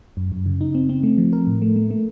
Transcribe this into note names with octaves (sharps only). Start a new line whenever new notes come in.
F#2
F#2
C#3
D#4
C4
C4
A3
F3
A#4
A2
A3
A3
A3